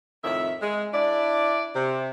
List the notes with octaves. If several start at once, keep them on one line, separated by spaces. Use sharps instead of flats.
F2 A2 D#3 E5
G#3
D4 E4 D5
C3